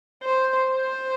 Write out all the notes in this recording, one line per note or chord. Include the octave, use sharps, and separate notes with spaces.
C5
C5